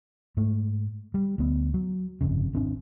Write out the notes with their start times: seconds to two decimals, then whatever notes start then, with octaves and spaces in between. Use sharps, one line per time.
0.37 G#2 A3
1.14 G3
1.38 D2 B3
1.74 F#3
2.21 G1 F2 C#3
2.53 G#1 C4 D4